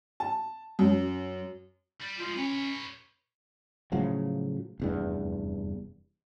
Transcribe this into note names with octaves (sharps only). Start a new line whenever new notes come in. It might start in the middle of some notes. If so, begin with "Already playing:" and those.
A5
F#2
G3
G#2 F3 F4
C#4 B4 C#5
A2 C#3 F3 F#3
F1 E2 G2